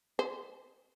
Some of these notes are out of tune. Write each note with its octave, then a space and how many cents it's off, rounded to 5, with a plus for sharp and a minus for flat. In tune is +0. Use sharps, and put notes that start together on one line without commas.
C5 -25